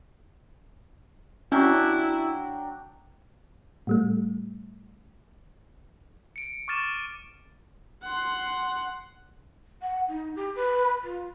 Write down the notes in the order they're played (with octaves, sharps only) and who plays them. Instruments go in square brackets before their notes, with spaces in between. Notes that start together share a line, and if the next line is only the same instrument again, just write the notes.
[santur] F#3 D4 G5 [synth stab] C#4 [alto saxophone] E4
[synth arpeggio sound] A2 G3 A3
[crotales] C#7 D7
C#6 D6 F6 A6 D#7 E7
[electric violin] F#5 C6
[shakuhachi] F#5
D#4
G4
B4
F4